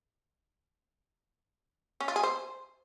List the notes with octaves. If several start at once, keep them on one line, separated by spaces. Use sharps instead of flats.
C#4
F4
G#4
C5